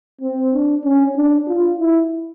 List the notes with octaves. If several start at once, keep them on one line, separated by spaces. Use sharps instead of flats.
C4
D4
C#4
D4
F4
E4